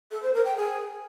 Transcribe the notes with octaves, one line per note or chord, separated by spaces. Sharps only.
A4
C5
A#4
G5
G#4